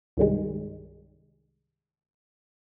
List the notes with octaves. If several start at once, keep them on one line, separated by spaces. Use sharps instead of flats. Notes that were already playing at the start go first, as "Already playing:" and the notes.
C2 G2 D#3 G3 G#3